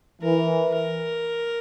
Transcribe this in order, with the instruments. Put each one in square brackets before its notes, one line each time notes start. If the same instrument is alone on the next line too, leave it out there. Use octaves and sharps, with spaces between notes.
[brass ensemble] E3 [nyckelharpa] A#4
[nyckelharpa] A#4